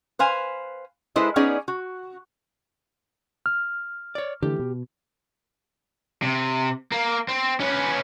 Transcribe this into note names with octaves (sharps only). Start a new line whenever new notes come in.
B4 C5 F5 G#5
G#3 E4 A4 B4 C5 D#5
B3 C#4 D#4 G#4 D5
F#4
F6
C#5 D5
D3 E3 A3 G4
B2
C3
A#3
C4
C#4 B4